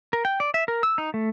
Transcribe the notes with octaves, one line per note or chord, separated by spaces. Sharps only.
A#4
G5
D5
E5
A#4
E6
D#4
A3